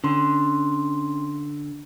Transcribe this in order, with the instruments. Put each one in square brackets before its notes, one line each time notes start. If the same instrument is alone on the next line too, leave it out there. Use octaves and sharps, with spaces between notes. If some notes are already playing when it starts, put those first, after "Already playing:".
[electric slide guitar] D3 [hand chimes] C#4 C6